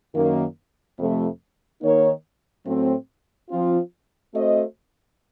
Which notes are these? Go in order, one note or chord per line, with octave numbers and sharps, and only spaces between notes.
F#2 D#3 A#3
F2 C3 F3 A3
D#3 A#3 D#4 A#4 C#5
A2 F#3 A3 C4
F3 C4 F4
A3 C4 F#4 C5 D#5